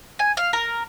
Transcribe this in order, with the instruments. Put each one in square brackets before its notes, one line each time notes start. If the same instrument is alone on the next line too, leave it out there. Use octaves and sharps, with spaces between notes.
[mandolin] G#5
F5
A#4